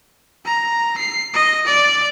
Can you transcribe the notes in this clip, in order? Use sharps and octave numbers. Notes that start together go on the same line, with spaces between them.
A#5
C7
D#5
D5